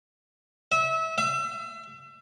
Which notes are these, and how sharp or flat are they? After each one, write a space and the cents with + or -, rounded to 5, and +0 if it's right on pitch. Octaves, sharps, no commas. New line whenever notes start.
E5 -25
E5 +35